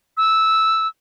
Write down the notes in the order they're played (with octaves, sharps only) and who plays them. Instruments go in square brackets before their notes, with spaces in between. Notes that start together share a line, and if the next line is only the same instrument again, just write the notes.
[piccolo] E6